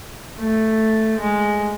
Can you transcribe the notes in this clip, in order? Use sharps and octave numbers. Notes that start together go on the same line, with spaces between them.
A3
G#3